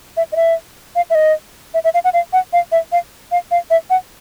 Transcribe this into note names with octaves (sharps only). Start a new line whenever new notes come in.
E5
D#5
E5
F5
E5
D#5
E5
E5
F5
F#5
F5
F#5
F5
E5
F5
F5
F5
E5
F#5